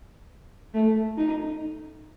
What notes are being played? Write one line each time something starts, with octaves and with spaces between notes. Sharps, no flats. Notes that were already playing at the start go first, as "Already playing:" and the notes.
A3
D#4